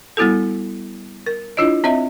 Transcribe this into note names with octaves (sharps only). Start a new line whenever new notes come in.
G3 B3 E4 F#4 A4
A#4
D4 E4 F4 C#5 D#5
C4 C#5 D#5 E5 A#5